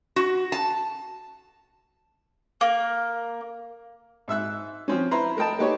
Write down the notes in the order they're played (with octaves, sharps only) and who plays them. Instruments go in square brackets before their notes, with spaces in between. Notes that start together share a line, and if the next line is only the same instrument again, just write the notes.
[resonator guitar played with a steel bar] F#4
A5
[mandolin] A#3
[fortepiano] G#2 E5 E6 F#6
F3 C4 C#4
E4 B4 C5 A#5
A3 A#4 D#5 G5 A5
A3 A#3 D#4 G4 B4 C#5